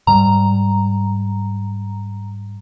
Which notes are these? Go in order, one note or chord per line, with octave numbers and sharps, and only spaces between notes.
G#2 G3 A#5